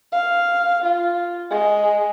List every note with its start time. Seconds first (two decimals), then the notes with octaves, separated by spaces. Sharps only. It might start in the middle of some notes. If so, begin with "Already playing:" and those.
0.12 F5
0.84 F4
1.50 G#3